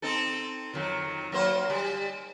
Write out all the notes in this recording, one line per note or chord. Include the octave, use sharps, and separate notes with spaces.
C4 D#4 A4
F2 D#3 F#3
F#3 A#3 C5
G3